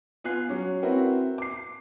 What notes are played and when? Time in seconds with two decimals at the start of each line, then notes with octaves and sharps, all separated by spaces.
0.24 B3 F4 G#5 F#6 C7
0.49 F#3 C#4
0.83 C4 E4 F#4 A#4 B4
1.38 D6 C7